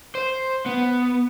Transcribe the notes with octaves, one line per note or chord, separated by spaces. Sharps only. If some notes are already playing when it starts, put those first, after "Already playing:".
C5
B3